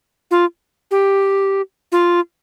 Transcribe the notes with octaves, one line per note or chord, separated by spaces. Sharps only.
F4
G4
F4